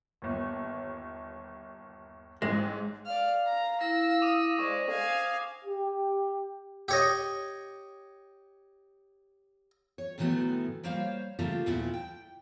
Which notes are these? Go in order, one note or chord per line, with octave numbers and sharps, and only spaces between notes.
G1 D#2
A1 G#2 G#3
D5 F5 F6
A#5
E4 E6 A#6
D6 D#6 D#7
G#3 G#4 C5 D5 C#6
C5 F5 G#5
G4
G4 C#5 D#5
C#5
A2 D#3 E3 F#3 A3 B3
G3 A#3 C5 C#5 F5
C#3 A3 A#3 F4 G4 A4
D#2 A#2 B3 E4
G5